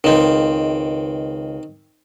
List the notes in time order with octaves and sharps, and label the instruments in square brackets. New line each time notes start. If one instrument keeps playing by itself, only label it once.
[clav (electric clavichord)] C#2 [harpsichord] D#3 C4